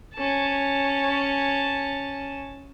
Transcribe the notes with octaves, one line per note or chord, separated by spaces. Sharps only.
C#4 A5